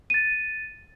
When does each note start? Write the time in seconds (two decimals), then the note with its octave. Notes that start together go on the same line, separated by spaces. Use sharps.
0.10 A6 D#7